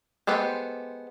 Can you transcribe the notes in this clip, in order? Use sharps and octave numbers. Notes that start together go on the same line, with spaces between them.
G#3 B3 G4 A4 C5